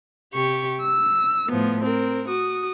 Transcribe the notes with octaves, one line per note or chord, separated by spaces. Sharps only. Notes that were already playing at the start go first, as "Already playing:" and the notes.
C3 G4 C#6
E6
A2 F3 B3
C4 A#4
F#4 D#6